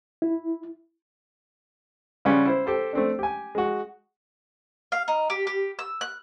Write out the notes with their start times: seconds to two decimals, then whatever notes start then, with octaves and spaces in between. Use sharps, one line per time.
0.22 E4
2.25 C#3 G3 B3 C#4 F4
2.46 E4 C5
2.66 G4 A4 C5
2.93 A3 C4 D4
3.19 G4 G#5
3.55 G#3 F#4
4.92 F5
5.08 D#4
5.30 G4
5.47 G4
5.79 E6
6.01 F#6